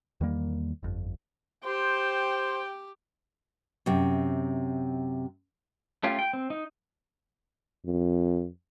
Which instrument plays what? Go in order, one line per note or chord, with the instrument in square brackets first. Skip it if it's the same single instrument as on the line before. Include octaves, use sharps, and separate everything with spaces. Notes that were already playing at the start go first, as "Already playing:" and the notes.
[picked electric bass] E2 D#3 G3 A#3
G1 F2
[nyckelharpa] G4 [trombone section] C5 [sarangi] G5
[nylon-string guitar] F#2 C3
[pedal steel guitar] A3 C#4 F4 G4
G5
C4
D#4
[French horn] F2